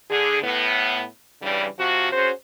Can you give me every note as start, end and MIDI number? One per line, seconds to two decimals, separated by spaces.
0.10 0.42 50
0.10 0.42 68
0.43 1.04 45
0.43 1.04 59
1.42 1.66 43
1.42 1.66 49
1.42 1.66 52
1.42 1.66 55
1.79 2.10 48
1.79 2.10 53
1.79 2.10 66
2.13 2.30 61
2.13 2.30 66
2.13 2.30 68
2.13 2.30 72